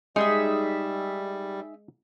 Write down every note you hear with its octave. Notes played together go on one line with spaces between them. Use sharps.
G3 G#3 D#4 G#4 E5